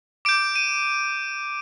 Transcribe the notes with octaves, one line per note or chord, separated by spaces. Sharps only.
D6 G6 D7
D#7